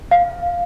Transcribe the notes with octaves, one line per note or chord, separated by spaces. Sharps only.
F5